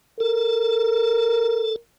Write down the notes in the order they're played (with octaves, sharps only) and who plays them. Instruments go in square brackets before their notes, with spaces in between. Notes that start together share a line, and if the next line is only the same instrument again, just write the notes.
[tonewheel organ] A4 [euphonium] A#4